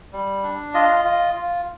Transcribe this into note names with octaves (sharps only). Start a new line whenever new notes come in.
G3
D4
F4 D#5
F4
F4